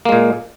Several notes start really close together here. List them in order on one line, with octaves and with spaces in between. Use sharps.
A#3 G#3 A#2